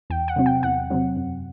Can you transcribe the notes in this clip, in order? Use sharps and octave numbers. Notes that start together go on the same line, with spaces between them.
E2 G5
F#5
C3 F#3 C4
G5
E2 F#5
C3 F#3 C4
F#2